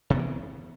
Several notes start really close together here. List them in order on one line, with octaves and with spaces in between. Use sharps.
C3 B3 E3